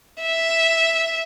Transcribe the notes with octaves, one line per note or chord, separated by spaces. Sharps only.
E5